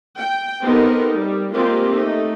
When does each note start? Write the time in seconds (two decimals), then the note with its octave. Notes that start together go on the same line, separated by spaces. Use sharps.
0.17 G5
0.63 B3 C4 D#4 G4 A4 A#4
1.15 G3
1.54 G#3 A#3 C4 F4 G4
1.93 A3 D#4